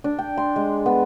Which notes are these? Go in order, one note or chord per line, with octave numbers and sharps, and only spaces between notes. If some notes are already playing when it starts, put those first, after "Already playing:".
D4
G5
C6
G#3
B3